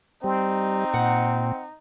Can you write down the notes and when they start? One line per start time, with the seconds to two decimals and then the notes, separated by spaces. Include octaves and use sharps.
0.24 G3 C4 D#4
0.94 A#2 F#5